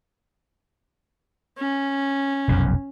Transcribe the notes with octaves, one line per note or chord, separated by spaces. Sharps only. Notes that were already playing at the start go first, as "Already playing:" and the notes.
C#4
F1 B1 F#2